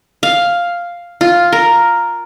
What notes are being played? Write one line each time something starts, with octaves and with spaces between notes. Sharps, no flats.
F5
F4
A#4